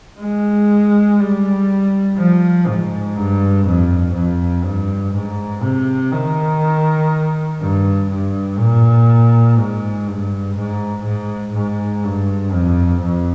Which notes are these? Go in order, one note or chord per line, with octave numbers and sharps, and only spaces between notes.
G#3
G3
F3
G#2
G2
F2
F2
G2
G#2
C3
D#3
G2
G2
A#2
G#2
G2
G#2
G#2
G#2
G2
F2
F2